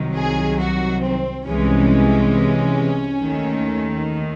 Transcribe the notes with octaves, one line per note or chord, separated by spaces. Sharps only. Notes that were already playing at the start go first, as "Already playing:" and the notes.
Already playing: C2 C3 D#3 F#3
G#4
F#4
C4
C2 C3 E3 G#3 C#4
D#2 D#3 A3